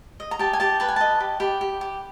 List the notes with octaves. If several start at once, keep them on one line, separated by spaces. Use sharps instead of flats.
D#5
A#5
G4 A5
G#5
G4 A5
B4 A5
G#5
D#5 A5
G4
G4 B5
G4
G4